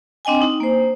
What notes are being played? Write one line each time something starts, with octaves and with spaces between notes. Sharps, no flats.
C4 D4 D#5 G5 G#5
D#4
A#3 C5